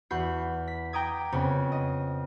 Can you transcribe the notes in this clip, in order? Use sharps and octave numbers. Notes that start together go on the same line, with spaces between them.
E2 F#4 F#5 B5 G6 C7
B6
G5 A#5 D6 D#6 G#6
F2 C#3 B3 C#5
D#5